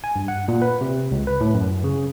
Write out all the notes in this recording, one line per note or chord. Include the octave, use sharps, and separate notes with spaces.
G#5
G2
F#5
A#2
B4
C3
C#2
B4
A2
F#2
C#3